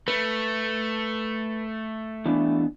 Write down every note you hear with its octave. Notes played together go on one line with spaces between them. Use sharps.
A3 B4
E3 B3 D4